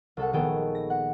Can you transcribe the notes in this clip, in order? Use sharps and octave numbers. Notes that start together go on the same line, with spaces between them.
C2 A4 F#5
A#1 D#3 B3 G#4 A4 G5
A#6
F#5